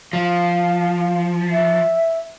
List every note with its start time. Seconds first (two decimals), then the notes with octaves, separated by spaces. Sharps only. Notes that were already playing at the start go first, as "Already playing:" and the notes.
0.13 F3 F5
1.51 E5